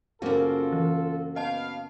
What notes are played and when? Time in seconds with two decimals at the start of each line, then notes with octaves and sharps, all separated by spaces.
0.22 F#2 C#3 A#3 C4 F4 F#4 A4
0.73 E3
1.36 B3 D#5 F5 A5